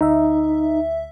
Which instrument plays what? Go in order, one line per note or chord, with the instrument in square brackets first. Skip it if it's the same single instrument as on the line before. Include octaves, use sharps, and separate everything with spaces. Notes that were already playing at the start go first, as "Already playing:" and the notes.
[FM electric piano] D2 E5 [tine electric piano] D#4